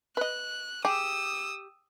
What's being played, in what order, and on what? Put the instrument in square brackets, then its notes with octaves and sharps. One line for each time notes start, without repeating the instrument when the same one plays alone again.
[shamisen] B4 D#5 [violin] F#6
[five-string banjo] G4 [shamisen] G#4 [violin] D#6 E6